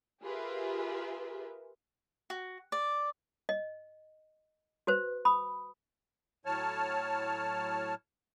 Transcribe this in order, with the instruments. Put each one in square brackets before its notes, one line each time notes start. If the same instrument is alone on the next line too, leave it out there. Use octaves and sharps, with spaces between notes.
[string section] F4 G4 G#4 A#4 B4 E5
[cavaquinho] F#4
D5
[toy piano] D#5
F#4 B4 C5
B5 D#6
[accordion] A2 F#3 C#5 A5 F6